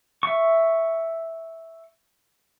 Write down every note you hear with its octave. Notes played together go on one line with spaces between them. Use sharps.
E5 C#6